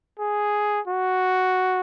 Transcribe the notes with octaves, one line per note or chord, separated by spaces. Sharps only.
G#4
F#4